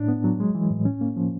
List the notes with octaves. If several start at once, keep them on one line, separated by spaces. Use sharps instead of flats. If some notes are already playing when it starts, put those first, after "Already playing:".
Already playing: A2 D4
B3
F#3
G#3
E3
A2
C#4
A#3
F3